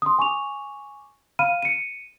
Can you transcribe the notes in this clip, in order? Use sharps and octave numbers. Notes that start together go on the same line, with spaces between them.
C6 D#6
G#5 C#6 D6 F7
F5 B5 F6 D#7
C#7 D#7